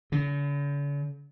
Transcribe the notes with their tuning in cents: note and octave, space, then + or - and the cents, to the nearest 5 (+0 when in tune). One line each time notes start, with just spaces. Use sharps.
D3 -45